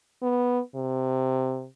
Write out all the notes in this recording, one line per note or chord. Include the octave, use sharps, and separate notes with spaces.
B3
C3